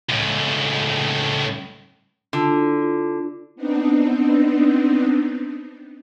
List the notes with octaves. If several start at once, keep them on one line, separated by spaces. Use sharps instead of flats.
C#2 A2
D3 F4 A5
E4 D6
F4
B3 C4 D4 D#4